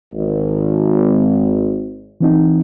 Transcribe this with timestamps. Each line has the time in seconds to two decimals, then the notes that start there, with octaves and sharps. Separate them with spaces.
0.13 G#1
2.20 E3 C4 D#4